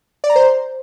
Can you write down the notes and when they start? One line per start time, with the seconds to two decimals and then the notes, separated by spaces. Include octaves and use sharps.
0.24 D5
0.30 A#5
0.36 C5